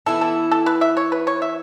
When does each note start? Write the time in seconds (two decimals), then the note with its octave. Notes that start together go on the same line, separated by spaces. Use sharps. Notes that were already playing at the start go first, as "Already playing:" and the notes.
0.06 E3 B3 E4 A4
0.21 A4
0.51 A4
0.66 B4
0.81 E5
0.97 C#5
1.12 B4
1.27 C#5
1.42 E5